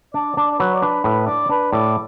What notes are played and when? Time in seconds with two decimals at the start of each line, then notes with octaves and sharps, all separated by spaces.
0.14 D4 D5
0.37 D4 D5
0.52 D5
0.59 F#3 B4
0.74 D5
0.82 D4 B4
1.04 A2 B4
1.27 D4 D5
1.49 D4 B4
1.72 A2 D5